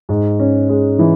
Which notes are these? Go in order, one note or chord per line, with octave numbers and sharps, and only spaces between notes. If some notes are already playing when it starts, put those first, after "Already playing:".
G#2
C#4
G#3
E3